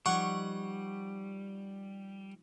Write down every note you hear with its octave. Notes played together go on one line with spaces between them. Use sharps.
F3 G3 D#4 F#5 C#6 G#6